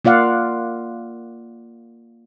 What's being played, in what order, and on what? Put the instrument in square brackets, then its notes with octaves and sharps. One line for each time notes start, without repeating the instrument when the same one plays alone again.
[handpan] A#3 F4 D5 F5 F#5